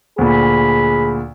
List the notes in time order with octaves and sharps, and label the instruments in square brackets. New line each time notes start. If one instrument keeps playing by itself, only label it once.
[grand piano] D2 A#2 [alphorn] G#4 [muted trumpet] B5